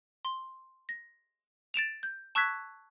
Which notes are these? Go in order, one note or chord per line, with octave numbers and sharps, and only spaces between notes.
C6
A#6
A6 D7 E7 F7
G6
A5 C#6 E6 F#6 G#6 B6